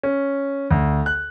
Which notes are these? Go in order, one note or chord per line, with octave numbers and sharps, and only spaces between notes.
C#4
D2
F#6